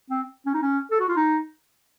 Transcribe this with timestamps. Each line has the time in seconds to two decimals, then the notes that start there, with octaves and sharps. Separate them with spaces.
0.10 C4
0.46 C#4
0.54 D#4
0.62 C#4
0.91 A4
1.00 F#4
1.09 F4
1.17 D#4